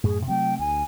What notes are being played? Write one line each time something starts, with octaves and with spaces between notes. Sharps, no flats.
F#2 A2 G#4
C3 F#3 A3 G5
D2 G#5